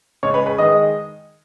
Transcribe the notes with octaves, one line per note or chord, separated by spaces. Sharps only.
C#3 G#3 C#5 C#6
B4 B5
B4 B5
D#3 G#3 D#5 D#6